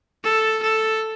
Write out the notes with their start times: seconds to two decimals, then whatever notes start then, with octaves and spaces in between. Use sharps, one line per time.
0.24 A4
0.63 A4